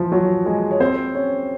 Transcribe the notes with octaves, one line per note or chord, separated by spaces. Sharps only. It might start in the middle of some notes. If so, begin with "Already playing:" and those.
Already playing: E3 F3 F4
F#3 F#4
G#3 G#4
C#5
C4 C5
C#4 C#5